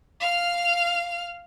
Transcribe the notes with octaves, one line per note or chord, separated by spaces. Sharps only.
F5 F6